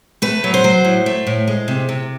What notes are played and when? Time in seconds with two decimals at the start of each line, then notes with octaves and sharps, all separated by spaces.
0.22 A3 B4
0.44 F#3
0.54 C5
0.64 F#3
0.84 A2
1.06 A3
1.27 A2
1.47 G#3
1.68 C3
1.89 C3